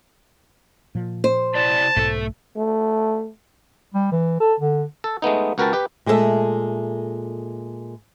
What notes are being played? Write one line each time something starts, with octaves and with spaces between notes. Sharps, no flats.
A#2 F3
C5
C3 E4 D5 A5
B1 G#2 B2 A3 A4
A3
G3
E3
A4
D3
A4
G#3 A3 B3 D#4
C#2 F#4 A#4 B4 G5 A5
G4 B4
A#2 G#3 A3 F4 A4 E5